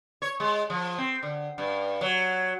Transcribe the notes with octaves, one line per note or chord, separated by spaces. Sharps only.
C#5
G#3
F3
C4
D3
G2
F#3